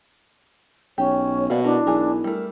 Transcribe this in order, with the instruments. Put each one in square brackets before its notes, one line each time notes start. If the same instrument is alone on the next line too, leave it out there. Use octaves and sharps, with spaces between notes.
[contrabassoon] B1 [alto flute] C#4 [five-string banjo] G4 [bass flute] C#5
[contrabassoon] B2 [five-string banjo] A#3 B4 D5 [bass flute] F5
[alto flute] D4 [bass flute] E4 [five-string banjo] A#4
[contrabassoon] B1 [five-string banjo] E3 G#4 A#4
[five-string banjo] G3 A3 [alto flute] A#4